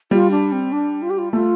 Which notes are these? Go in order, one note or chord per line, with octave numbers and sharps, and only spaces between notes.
G3 F4
D4
C4
D4
F4
G4
F4
A3 F4